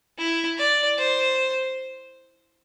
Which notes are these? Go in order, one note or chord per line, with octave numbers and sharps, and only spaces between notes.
E4
D5
C5